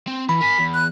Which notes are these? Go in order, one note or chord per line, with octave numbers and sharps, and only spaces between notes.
C4
E3 B5
A#4 G#5 B6
E2
F#6